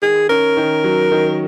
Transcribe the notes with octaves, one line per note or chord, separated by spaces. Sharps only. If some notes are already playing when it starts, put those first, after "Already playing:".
D#3 G#4
C#4 A#4
D#3
F#3
D#3